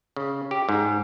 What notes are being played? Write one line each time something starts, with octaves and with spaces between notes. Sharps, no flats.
C#3
G4
G#2